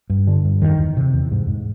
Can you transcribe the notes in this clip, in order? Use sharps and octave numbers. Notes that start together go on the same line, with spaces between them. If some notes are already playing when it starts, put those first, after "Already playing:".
G2
D3
G2
E2 D#3
E2
C3
E2
G#2
G#2